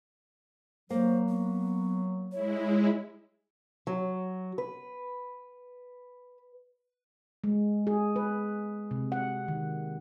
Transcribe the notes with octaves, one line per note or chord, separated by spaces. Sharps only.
F#3 A#3 C5
B3
G#3 E4 C#5
F#3
B4
G#3
G#4
B4
C3
F#5
D#3